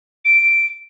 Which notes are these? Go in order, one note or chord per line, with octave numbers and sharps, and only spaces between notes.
D7